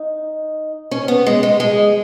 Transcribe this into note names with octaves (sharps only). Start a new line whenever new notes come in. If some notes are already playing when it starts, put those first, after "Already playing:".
Already playing: D#4
C#4
B3
G#3
G#3
G#3